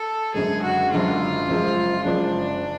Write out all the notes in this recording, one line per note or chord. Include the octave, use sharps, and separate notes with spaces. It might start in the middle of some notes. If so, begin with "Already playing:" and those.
Already playing: A4
F#1 F#2 D3 G#3 G#4
F#4
F#1 F#2 D3 G#3 F4
F#1 F#2 F3 G#3
F#1 F#2 F3 G#3 D4